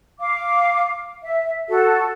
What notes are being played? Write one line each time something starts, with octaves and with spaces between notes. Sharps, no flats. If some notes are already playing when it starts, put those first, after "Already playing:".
F5 D6
E5
F#4 A4